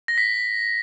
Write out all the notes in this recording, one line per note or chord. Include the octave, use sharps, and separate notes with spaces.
A#6
B6